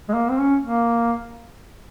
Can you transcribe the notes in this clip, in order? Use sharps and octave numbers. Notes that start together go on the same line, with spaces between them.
G#3
A#3
C4
C#4
A#3